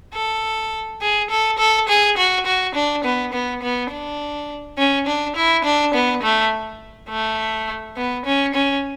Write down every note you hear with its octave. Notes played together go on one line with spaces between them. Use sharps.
A4
G#4
A4
A4
G#4
F#4
F#4
D4
B3
B3
B3
D4
C#4
D4
E4
D4
B3
A3
A3
B3
C#4
C#4